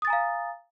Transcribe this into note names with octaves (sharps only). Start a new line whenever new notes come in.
F5 G#5 A#5 D#6 A6